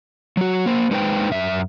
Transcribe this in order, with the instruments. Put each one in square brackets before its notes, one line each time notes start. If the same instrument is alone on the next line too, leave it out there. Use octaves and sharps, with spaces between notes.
[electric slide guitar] F#3 F#4
A#3 C5
G#3 D#4 B4 C5 G5
F#2 E5